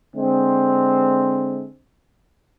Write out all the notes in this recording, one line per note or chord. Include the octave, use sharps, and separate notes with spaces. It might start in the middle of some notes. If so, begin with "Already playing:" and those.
D3 G#3 C4